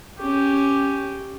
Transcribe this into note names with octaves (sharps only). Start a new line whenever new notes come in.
C#4 G4